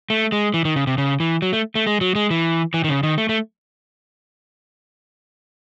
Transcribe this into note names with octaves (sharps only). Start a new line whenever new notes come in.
A3
G#3
E3
D#3
C#3
C3
C#3
E3
F#3
A3
A3
G#3
F#3
G#3
E3
E3
D#3
C#3
D#3
A3
A3